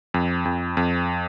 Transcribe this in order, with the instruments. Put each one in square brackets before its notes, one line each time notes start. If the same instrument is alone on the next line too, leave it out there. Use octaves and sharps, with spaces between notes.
[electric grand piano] F2
F2
F2